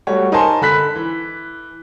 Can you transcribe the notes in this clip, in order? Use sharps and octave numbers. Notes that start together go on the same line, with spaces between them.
G3 A3 F#4 C#5
D#4 A#4 C5 G#5 A5 C6
D3 B5 F#6 B6
E3